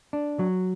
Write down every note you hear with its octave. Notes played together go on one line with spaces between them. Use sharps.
D4
F#3